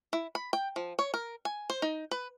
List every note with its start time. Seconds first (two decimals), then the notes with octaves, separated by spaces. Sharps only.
0.13 E4
0.35 B5
0.53 G5
0.76 F3
0.99 C#5
1.14 A#4
1.45 G#5
1.70 C5
1.82 D#4
2.11 B4